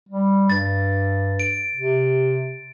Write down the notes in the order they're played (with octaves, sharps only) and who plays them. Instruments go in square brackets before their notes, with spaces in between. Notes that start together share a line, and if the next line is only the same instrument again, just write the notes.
[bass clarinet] G3
[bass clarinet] G2 [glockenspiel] A6
[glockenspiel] D7
[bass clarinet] C3